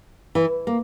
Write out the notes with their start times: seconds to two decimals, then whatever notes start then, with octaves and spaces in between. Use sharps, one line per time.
0.35 E3
0.67 A#3